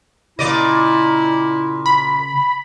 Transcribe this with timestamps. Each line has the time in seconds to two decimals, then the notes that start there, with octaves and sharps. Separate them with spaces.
0.39 A#2 C#3 E4 D5 D#5
1.86 B5